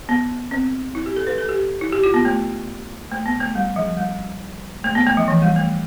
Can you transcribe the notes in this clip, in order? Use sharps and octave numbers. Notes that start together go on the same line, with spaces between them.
B3
C4
E4
G4
A4
B4
A4
G4
E4
G4
F4
B3
A3
A3
B3
A3
G3
F3
G3
A3
B3
A3
F3
E3
G3
A3